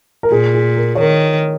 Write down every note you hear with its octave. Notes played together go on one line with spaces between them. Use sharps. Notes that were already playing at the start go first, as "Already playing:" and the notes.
A#4
A#2 G#4
G#4
A#4
C#5
D#3 A#4